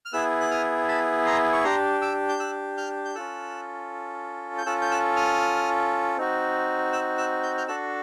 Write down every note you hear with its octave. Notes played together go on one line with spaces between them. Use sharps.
F6
B3 E4 G#4 E6 F#6
F#6
D#6 F6
A5 B5
A#5 C6
C#6
D4 G4 A#5 C6
D6 E6
G6
E6 F#6
F6 G6
G6
C#4 F4 A4 E6 F#6
G6
C#4 F4 A4 E6 F#6
G6
E6 F#6
D#6 F6
C4 D#4 F#4
E6 F#6
E6 F#6
G6
F6 G6
D4 F#4 A4 E6 F#6